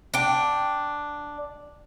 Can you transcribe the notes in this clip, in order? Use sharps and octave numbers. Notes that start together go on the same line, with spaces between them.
D4 G5